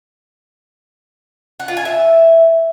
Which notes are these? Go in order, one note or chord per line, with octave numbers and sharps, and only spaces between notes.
F#5
F4
G#5
E5